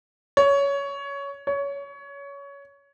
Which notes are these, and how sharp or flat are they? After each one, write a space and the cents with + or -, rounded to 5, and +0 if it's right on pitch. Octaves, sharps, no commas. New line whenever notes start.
C#5 +15
C#5 +20